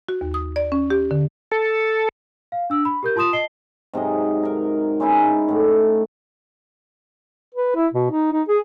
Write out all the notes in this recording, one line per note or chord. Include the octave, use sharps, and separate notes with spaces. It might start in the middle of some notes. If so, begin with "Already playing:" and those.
F#4
D#2
D#6
D5
C#4
G4
D3
A4
F5
D4 E6
B5
G4 A#4 G6
F4 A5 C6 D#6 E7
D#5 A5 C7 G7
G#2 C3 F#3 D#5
D#4 A#4
G#3 C#4 D#4 E4
A2 A3
B4
E4
B2
D#4
D#4
G#4